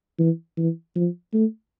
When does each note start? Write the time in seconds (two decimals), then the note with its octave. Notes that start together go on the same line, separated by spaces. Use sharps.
0.18 E3
0.57 E3
0.95 F3
1.33 A3